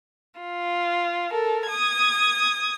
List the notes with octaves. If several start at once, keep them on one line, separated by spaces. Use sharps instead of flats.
F4
A4 A#4
D#6 G#6